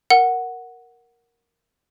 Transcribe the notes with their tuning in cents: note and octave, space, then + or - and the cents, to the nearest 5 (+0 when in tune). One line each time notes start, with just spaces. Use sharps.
A#4 +0 F#5 +0